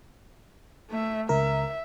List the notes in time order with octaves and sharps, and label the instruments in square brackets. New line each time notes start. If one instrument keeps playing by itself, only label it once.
[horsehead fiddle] A3 E5
[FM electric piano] C#2 A#4 [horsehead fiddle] E5